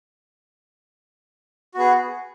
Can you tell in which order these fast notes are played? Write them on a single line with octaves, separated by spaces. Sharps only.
F#4 B3 G#4